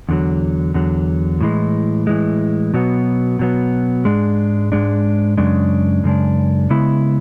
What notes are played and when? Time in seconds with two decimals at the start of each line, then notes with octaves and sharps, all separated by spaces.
0.09 E2 D3 F#3
0.74 E2 D3 F#3
1.41 A2 E3 G#3
2.07 A2 E3 G#3
2.74 B2 F#3 B3
3.39 B2 F#3 B3
4.05 G#2 G#3 D4
4.72 G#2 G#3 D4
5.37 F#2 C#3 G#3 D4
6.04 F#2 C#3 G#3 D4
6.70 C#3 G#3 B3 E4